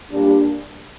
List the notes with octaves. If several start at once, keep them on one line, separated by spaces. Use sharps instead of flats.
A#2 G3 D4